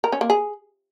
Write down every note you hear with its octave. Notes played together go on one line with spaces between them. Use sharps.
A#4
C#4
A#3
G#4